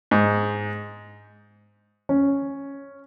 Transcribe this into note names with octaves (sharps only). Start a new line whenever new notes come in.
G#2
C#4